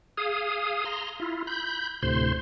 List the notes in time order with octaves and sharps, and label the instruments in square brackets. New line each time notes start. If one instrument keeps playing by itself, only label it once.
[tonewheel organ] G#4 F5 D#6
A#5 C6
E4 F4
B5 G6
D2 A2 C3 C5 C6